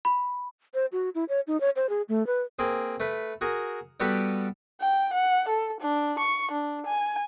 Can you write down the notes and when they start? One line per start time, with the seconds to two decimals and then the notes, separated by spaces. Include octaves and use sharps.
0.05 B5
0.74 C5
0.92 F#4
1.15 E4
1.29 C#5
1.47 D#4
1.61 C#5
1.76 C5
1.89 G#4
2.09 A3
2.27 B4
2.59 A#3 C4 G#4
3.00 A3 B4
3.41 F#4 G#4 A#4
4.00 G3 B3 F#4 G4 A4 B4
4.81 G5
5.13 F#5
5.49 A4
5.81 D4
6.19 C#6
6.51 D4
6.87 G#5